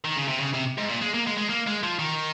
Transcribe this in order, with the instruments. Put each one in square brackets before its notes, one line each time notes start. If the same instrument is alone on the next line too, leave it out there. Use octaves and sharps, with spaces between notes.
[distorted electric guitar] D#3
C#3
C3
C#3
C3
G#2
A#2
G#3
A#3
G#3
G#3
A#3
G#3
F3
D#3